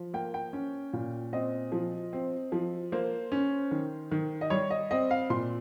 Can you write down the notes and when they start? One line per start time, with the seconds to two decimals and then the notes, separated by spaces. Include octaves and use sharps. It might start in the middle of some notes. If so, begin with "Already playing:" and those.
Already playing: F3
0.14 A#3 G5
0.34 G5
0.53 C#4
0.93 A#2
1.33 C4 D#5
1.72 F3
2.13 C4
2.52 F3
2.92 A#3 C5
3.32 C#4
3.71 D#3
4.11 D#3
4.41 D#5
4.50 G3 C#5
4.70 D#5
4.91 C4 D#5
5.11 F5
5.30 A#2 C6